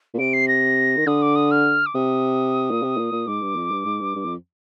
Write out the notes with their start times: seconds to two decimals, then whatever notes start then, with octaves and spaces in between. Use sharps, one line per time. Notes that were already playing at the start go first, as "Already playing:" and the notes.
0.14 A#2
0.19 C3 D7
0.33 C7
0.48 A#6
0.97 D#3
1.06 D3 D#6
1.22 D6
1.36 D#6
1.51 F6
1.86 D6
1.95 C3 D#6
2.71 A#2
2.83 C3
2.98 A#2
3.12 A#2
3.27 G#2 D6
3.42 G2
3.56 F2
3.71 G2
3.86 G#2
4.01 G2
4.16 G2
4.25 F2